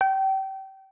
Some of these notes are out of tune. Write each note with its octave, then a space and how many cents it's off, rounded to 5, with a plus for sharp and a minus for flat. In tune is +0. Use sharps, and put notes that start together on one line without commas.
G5 -30